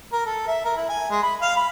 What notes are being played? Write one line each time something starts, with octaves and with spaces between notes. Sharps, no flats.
A#4
A4
E5
A#4
E4
G#5
G#3
B5
F5
B5